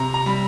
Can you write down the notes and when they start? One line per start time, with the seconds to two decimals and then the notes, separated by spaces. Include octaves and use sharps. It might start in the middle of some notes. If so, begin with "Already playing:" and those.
Already playing: C3 A#5
0.14 A#5
0.26 G3 B5